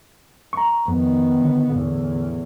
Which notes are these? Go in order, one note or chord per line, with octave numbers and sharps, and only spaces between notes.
A#5 C#6
F2 D#3 B3
D3
E2 A2